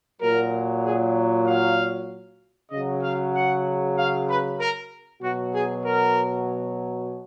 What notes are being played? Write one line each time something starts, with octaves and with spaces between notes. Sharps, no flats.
A#2 F#3 A#4
G#4
F5
C#3 F#3 D#5
F5
F#5
F5
B4
A#4
B2 F#3 F#4
G#4
A#4